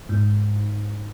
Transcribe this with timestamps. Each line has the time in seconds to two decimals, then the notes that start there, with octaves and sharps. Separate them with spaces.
0.09 G#2